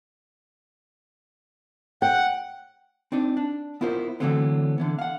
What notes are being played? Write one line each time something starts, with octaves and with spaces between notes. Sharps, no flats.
F#5 G5
C4 D4 D#4
D4
B3 E4 F4 A#4 C5
D3 E3 F#3 A3 B3 C4
D3 E3 B3
F5 F#5